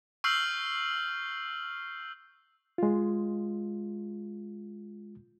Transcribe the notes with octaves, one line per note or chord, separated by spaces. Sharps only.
C#6 E6 F6 G6 C7 F#7
G#3 F4